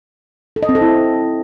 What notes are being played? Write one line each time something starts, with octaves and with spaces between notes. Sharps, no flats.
A4
D#5
C4
A4
E4